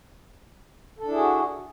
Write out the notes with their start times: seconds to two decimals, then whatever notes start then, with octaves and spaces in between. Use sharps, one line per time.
0.99 A4
1.03 D4
1.08 E4
1.13 G#4
1.18 F#4